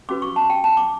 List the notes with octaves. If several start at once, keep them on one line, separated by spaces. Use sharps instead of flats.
C#4 F#4 B4 D6
C#6
A5
G5
A5
D6